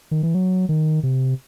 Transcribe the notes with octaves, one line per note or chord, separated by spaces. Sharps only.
D#3
E3
F#3
D#3
C3